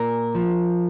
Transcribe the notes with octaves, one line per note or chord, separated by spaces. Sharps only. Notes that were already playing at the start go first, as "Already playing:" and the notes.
Already playing: A#2 A#4
F3